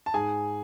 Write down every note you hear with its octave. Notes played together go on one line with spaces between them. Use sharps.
A5
G#2 G#4 G#5